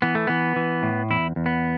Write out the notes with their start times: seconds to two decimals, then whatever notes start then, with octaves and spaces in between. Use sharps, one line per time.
0.02 E3 B3
0.15 A3
0.27 E3 B3
0.56 E3
0.83 A2
1.10 E2 E4
1.36 E2
1.46 B3